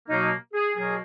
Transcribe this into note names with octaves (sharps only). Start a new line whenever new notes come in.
B2 F#3 A#3 D#4
G#4
B2 F#3 A#3 G#4